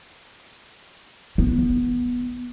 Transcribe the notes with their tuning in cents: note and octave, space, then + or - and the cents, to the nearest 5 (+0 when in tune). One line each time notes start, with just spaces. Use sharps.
B3 -15